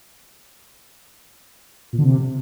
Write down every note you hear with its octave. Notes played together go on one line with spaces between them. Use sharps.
A#2
D3
C3